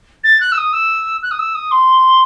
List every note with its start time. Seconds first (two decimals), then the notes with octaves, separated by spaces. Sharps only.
0.24 A6
0.41 F#6
0.52 E6
0.58 D#6
0.73 E6
1.23 F#6
1.31 D#6
1.39 E6
1.55 D#6
1.71 C6